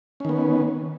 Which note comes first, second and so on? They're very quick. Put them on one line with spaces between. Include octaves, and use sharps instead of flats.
C#4 D#3 B3